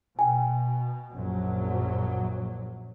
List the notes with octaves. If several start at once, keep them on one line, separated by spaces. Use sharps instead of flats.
B2 G5 G#5
A#1 F#2 F#3